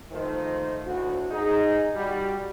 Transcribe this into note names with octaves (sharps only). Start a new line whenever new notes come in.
D#3 F3 A3 F4 C5
D2 A2 F#4
D#4 G#4
G3 F#4